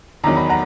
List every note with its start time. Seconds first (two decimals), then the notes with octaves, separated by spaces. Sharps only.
0.24 E2 D#3 F#3 A#5
0.37 B5
0.49 F#5 A#5